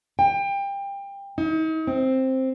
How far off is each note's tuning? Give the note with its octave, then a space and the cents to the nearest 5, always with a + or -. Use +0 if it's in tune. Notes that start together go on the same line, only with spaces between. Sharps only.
G5 +25
D#4 +40
C4 +5